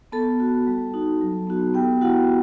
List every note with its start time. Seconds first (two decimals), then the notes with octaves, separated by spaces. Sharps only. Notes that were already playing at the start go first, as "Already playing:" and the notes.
0.12 B3 A4 A5
0.40 F#4
0.67 G3
0.94 D#4 F#4
1.21 F#3
1.47 B3 D#4 F#4
1.74 B3 G4 G5
2.01 E4 F#4 F#5